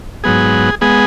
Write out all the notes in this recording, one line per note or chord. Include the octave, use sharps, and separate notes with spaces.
G#2 F#3 B3 G#4
G#3 B3 G#4